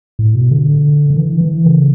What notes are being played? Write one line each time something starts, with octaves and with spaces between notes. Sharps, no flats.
A2
B2
D3
D3
E3
E3
C#3